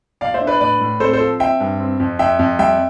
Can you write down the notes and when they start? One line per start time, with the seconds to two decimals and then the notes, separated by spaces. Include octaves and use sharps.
0.21 B1 D5 F5
0.34 C5 E5
0.41 D4
0.47 B4 D5
0.61 A2 B4 D5
0.80 A2
1.00 C4 A4 C5
1.13 A4 C5
1.20 F3
1.40 C4 E5 G5
1.60 G2
1.80 C4
2.00 F2
2.19 F2 E5 G5
2.39 F2
2.59 G3 E5 G5